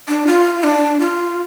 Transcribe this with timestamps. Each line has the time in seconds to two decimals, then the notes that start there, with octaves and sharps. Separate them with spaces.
0.08 D4
0.27 F4
0.63 D4
1.00 F4